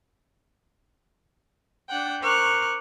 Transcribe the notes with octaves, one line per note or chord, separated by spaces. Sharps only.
D4 F#5 G5
A#4 C5 C#6 D6 F6 F#6